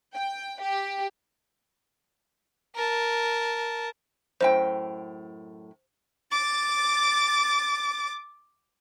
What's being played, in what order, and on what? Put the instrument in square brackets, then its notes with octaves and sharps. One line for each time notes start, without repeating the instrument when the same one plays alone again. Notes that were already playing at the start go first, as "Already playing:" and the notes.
[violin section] G5
G4
[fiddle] A#4 A5
[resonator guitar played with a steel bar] F#2 A2 G5 [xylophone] C5
[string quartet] D6 A6